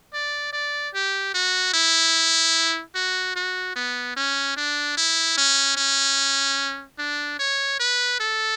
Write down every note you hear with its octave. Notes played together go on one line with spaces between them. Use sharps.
D5
D5
G4
F#4
E4
F#4
F#4
B3
C#4
D4
E4
C#4
C#4
D4
C#5
B4
A4